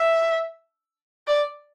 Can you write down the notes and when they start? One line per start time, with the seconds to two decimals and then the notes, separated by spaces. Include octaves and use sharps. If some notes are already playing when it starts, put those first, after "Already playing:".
Already playing: E5
1.27 D5